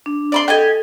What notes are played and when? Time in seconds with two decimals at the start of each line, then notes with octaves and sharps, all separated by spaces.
0.06 D4
0.32 D5 B5 C6
0.48 G4 A4 D#5 G#5